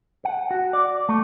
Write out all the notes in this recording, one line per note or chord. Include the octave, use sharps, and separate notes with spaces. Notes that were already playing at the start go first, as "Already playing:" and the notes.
F#5
F#4
D5
A3